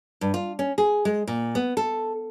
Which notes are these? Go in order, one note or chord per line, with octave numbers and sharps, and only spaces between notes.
G2
F4
C#4
G#4
G#3
A#2
B3
A4